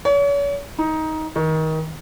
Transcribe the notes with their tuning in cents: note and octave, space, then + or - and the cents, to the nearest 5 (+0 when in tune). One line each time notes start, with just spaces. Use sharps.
C#5 +40
D#4 +15
D#3 +25